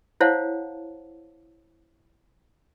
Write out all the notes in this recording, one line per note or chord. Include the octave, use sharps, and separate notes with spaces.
E4 C5 C#5 F5 F#5 A5